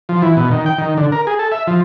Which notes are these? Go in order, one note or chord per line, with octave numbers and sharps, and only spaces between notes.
F3
E3
B2
D#3
G5
D#3
D3
A#4
G#4
A4
E5
F3